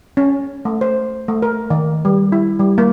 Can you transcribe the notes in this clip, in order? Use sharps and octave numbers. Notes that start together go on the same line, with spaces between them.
C#4
A3
C5
A3
A#4
D#3
G3
E4
G3
A#3